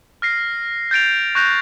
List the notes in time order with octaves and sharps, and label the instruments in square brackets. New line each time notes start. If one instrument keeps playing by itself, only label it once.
[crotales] F6 A#6 C7
G6 A6 D7 F7
C#6 F#6 G6 A#6 F7